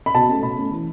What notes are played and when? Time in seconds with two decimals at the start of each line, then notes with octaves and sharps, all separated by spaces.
0.06 B5
0.14 B2 A5
0.29 A3 C#4
0.42 B2 B5
0.57 A3 C#4
0.71 E3